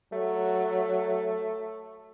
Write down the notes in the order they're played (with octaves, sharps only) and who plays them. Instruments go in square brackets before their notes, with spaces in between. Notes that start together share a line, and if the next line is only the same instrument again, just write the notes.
[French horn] F#3 [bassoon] A3